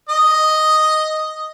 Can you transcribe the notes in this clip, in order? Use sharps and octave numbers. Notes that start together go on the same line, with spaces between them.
D#5